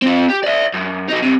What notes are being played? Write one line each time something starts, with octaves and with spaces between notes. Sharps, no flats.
C4 F4
G4
D5 E5
F#2
F#3 D#4
C2 C3